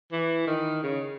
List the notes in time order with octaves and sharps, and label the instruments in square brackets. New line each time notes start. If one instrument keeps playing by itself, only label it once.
[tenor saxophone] E3
D#3
C#3